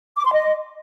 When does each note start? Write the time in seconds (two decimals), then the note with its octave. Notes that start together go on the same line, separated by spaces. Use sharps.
0.16 D6
0.25 C6
0.33 D#5